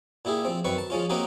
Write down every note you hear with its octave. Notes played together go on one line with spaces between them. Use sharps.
A#2 E4 G4 G#4
F3 C4
F#2 D#3 C4 B4 C#6
A5
F3 G#3 C#4 F4
A#3 C4 C#4 D#4 F#4 G4